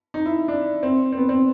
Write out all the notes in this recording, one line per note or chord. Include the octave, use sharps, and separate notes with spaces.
D#4
E4
D4
C4
C4
B3
C4